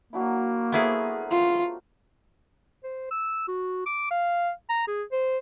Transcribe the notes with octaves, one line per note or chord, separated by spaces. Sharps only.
F#3 A#3 D4 E4
A3 B3 E4 G#4 A#4 C5
F4
C5
E6
F#4
D6
F5
A#5
G#4
C5